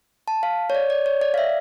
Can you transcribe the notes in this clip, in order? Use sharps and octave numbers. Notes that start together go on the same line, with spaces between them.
A5
F5
C#5
D5
D5
C#5
D5
F5
E5